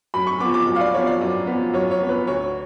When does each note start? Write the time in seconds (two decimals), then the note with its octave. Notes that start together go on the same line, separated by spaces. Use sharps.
0.14 F#2 B5
0.27 C#6
0.40 F3 B3 D6
0.54 D6
0.67 F#2
0.76 F5
0.81 D5
0.94 F3 B3 C#5
1.07 D5
1.21 F#2
1.47 F3 B3
1.73 F#2 C#5
1.91 C#5
2.00 F3 B3
2.09 B4
2.27 D2 C#5